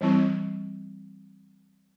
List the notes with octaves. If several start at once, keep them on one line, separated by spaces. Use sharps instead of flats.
E3 G3 C4 E4